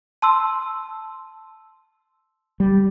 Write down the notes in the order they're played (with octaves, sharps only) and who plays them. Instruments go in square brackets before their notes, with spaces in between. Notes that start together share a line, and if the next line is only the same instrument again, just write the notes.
[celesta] A5 C6 E6
[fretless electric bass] G3